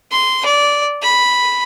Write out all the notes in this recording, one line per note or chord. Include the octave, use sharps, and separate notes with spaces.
C6
D5
B5